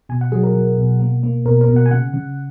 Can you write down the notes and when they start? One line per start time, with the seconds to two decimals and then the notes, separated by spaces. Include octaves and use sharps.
0.09 B2 G#5
0.21 F#5
0.32 F#3 G#4
0.43 A#4
0.55 F#3
0.78 B2
1.00 A#3
1.23 A#3
1.45 B2 A#4
1.61 A#4
1.68 B2
1.76 F#5
1.86 G#5
1.91 C#3 F#5
2.14 C#3